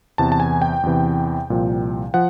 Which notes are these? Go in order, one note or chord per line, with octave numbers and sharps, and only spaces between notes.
E2 C3 E3 A5
A5
G#5
G5
E2 C3 E3
C2 A#2 F3
F3 F#5